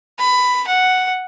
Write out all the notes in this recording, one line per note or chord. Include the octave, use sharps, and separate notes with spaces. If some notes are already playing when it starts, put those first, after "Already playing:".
B5
F#5